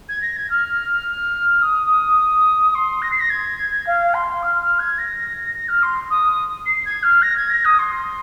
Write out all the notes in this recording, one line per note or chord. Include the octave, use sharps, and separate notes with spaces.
G#6
A#6
G#6
F6
D#6
C6
A#6
C7
A#6
G#6
F5
C6
F6
F6
G#6
A#6
A#6
F6
C6
D#6
C7
G#6
F6
A#6
G#6
A#6
D#6
C6